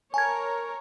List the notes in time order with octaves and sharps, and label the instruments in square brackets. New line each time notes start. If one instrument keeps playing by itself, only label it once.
[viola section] A#4 C#5 [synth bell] G#5 A5 G#6